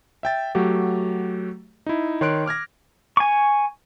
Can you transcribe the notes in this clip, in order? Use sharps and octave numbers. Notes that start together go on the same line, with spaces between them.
E5 G5 A6
F#3 A3 F#4 G4
D#4 E4
D#3 C#5 C6 F#6 D7
D6 F6 G#6 A#6
G#5 C#6